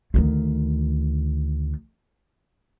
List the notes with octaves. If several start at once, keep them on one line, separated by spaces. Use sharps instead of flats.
D2 D#3